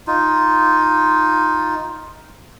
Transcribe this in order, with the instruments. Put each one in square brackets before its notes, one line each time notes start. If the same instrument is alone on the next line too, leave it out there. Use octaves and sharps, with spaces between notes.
[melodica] D#4 F4